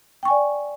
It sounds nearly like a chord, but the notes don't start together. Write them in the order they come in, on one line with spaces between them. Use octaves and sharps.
G5 C#6 G#5 D5